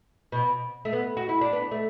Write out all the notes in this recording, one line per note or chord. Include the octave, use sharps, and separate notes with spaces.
B2
A3
B3
F#4
E4
D4
B3
A3